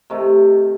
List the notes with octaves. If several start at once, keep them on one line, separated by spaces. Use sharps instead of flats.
C3 D#3 A3